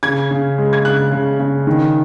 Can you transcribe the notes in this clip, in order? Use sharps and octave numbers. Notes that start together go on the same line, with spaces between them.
C#3 G#6
C#3
G#3
G#6
C#3 F#6
C#3
C#3
D#3